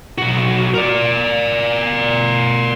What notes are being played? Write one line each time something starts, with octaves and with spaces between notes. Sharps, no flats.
B1 F#4
A#4 D5